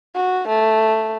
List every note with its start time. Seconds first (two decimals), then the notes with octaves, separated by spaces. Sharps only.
0.15 F#4
0.49 A3